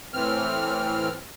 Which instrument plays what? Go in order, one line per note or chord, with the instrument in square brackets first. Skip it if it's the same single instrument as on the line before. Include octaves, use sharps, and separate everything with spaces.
[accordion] A2 E3 C4 F6